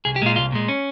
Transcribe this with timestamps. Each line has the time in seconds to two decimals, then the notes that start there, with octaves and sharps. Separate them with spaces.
0.05 C2 G#4
0.16 G4
0.22 A#2 G#3 F4
0.36 C2 F4
0.52 A#2 G#3
0.68 C#4